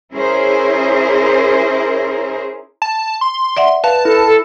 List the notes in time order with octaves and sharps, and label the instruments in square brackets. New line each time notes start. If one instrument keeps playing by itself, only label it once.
[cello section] C#4 E4 G#4 A#4 C5
[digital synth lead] A5
C6
[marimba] D5 E5 F#5
[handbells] B4 [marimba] F5 [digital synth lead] A5
[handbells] E4 [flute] A4
[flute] A4